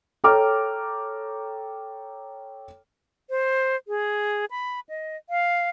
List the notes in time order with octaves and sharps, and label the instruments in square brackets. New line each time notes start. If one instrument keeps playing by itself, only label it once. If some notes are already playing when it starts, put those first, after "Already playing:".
[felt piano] A4 C#5 G5 A#5 D6 F6
[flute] C5
G#4
B5
D#5
F5